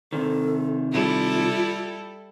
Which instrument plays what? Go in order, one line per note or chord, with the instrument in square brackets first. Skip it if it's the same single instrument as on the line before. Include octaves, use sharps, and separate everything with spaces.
[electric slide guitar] C3 D#3 [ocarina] A4
[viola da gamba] G3 E4 A4 [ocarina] F4